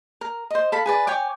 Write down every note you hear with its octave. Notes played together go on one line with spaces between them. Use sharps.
A#4
C5 D#5
A4 F5 B5
G#4 B4 D5
C#5 G5 G#5 D6